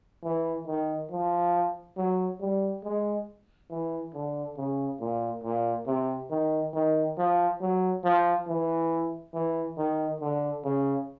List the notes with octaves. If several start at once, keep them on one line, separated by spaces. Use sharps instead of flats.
E3
D#3
F3
F#3
G3
G#3
E3
D3
C#3
A#2
A#2
C3
D#3
D#3
F3
F#3
F3
E3
E3
D#3
D3
C#3